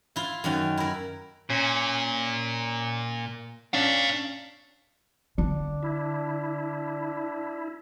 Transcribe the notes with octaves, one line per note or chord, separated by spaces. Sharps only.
E4 F4
F#2 D#3 C#4
E4 A#4
A#2 C#4
C#4 D4 D5 F5
D3 D4
E4